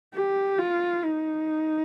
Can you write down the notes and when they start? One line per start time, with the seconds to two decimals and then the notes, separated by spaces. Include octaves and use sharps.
0.14 G4
0.58 F4
1.04 D#4